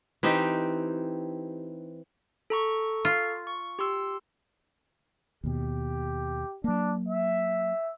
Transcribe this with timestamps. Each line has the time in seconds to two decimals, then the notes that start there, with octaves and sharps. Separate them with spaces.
0.23 E3 C4 D#4 G4
2.50 A4 A#5 C#6
3.05 F4
3.47 C#6
3.79 G4 C6 E6
5.44 D#2 B2 G4
6.64 F#3 A#3 D4
7.09 E5